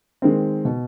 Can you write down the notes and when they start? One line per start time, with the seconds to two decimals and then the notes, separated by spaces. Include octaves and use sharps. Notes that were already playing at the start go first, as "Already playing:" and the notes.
0.22 D#3 G#3 C4
0.65 B2